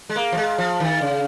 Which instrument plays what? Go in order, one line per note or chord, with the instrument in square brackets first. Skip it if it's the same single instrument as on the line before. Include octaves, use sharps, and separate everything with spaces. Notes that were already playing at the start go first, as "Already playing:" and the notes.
[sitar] G#3
[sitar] A#3 [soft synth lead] F5
[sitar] F3
G#3
F3
D#3
C#3